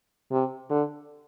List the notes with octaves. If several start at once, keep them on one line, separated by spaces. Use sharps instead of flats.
C3
D3